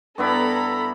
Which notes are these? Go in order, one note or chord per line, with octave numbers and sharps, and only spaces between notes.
G2 B3 E4 A4 A#5 B5